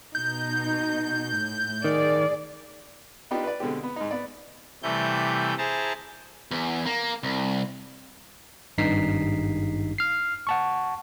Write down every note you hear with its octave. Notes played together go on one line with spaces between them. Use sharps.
B2 D#4 G6
A2
D#3 G#4 D5
B3 D4 D#4 F4 G4
B4 D5
B2 D3 G#3 C4 G4
B3
G#2 D#4
B3 D5
C3 E3 G3 A3 G6
E4 G#4 C5 A5 A#5
E2
A#3
C2
G#1 G2 D#4 B6 C7
F6 C7
F#5 A5 C#6